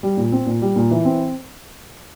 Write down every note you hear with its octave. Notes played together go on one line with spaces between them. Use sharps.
G3
A#2
C4
A#2
G3
A#2
E3
C4